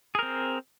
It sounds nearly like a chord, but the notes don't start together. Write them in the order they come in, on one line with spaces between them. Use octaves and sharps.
G#4 A#4 C4